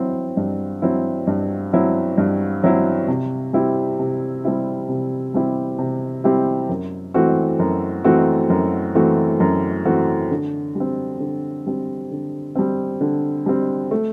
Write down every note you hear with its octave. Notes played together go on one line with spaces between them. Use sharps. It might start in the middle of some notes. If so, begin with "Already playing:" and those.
Already playing: F#3 C4 E4
G2
F#3 C4 E4
G2
F#3 C4 E4
G2
F#3 C4 E4
C3
G3 C4 E4 G4
C3
G3 C4 E4 G4
C3
G3 C4 E4 G4
C3
G3 C4 E4 G4
F#2
E3 A3 C4 F#4
F#2
E3 A3 C4 F#4
F#2
E3 A3 C4 F#4
F#2
E3 A3 C4 F#4
D3
G3
C4
D3
G3 C4
D3
G3 C4
D3
G3 C4
A3